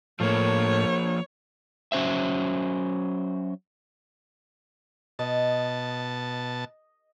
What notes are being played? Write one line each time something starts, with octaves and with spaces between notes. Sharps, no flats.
A2 F3 A#3 C#5
F#3 C#4 C5 E5
B2 D#5 A5